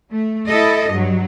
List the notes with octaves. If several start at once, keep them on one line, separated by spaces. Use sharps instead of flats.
A3
E4 A4 D#5
G2 F#3